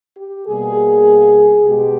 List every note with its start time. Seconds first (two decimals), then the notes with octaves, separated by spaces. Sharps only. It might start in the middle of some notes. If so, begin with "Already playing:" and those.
0.17 G4
0.46 B2 G3 A#3 G#4
1.64 B2 G#3 G4